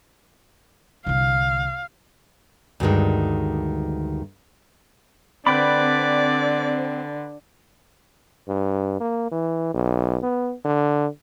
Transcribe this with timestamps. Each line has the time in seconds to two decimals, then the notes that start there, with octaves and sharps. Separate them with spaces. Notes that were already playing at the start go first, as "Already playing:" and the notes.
1.06 C2 D3 F5
2.80 D2 G2 D#3 G#3
5.47 D3 C4 B4 D5 G5 B5
8.48 G2
9.00 A#3
9.32 E3
9.74 B1
10.23 B3
10.65 D3